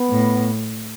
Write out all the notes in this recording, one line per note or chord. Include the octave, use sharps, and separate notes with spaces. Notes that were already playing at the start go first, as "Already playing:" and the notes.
Already playing: B3
A2